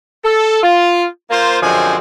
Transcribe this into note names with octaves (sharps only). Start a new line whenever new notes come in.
A4
F4
A#3 F4 C5
F#2 D3 F3 G#3 C4 G#5